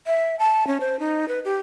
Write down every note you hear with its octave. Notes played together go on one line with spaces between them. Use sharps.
E5
A5
C#4
C5
D#4
B4
G4